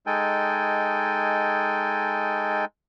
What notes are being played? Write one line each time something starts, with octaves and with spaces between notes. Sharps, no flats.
G#3 D#4 A4 G5 G#5